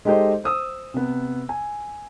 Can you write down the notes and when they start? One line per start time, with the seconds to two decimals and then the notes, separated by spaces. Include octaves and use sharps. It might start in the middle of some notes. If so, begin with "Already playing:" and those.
0.05 G#3 D#4 G4 A4 C5 D#5
0.44 C5 D#6 E6
0.94 C3 B3
1.49 G#5